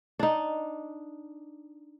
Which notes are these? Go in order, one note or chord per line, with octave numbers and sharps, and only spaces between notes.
D4 D#4